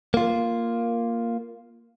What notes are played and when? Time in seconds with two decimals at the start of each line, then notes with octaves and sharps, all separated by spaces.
0.14 A#3 F4